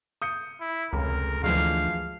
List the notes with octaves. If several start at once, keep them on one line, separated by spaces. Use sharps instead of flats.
D#6 G6 C#7
E4
F1 C#2 A#4
D2 E3 F3 G#3 F5